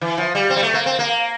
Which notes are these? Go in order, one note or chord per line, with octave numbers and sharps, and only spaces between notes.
E3
F3
G3
C4
G3
A3
A#3
C4
A#3